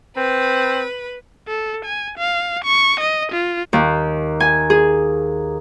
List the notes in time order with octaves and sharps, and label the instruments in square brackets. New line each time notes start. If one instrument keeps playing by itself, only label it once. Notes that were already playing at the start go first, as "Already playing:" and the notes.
[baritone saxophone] C4 [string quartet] B4
[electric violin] A4
G#5
F5
C#6
D#5
F4
[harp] D#2
G#5
G#4